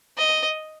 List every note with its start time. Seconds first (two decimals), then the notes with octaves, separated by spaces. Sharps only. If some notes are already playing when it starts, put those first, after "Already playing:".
0.17 D#5